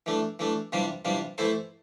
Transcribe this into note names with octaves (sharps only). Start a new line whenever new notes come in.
E3 A3 D4
E3 A3 D4
C3 E3 G3 D4 F4
C3 E3 G3 D4 F4
E3 A3 E4 A4 C5